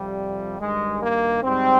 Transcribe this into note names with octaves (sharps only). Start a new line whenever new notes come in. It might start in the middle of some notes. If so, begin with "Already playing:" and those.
Already playing: F2 C3 F3 G3
G2 D#3 G3 G#3
A#3
G#2 G3 C4